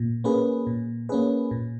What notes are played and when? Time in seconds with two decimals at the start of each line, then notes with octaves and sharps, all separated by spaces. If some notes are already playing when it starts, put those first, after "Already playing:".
Already playing: A#2
0.24 A#3 C#4 G#4 B4
0.67 A#2
1.09 A#3 C#4 G#4 B4
1.51 A#2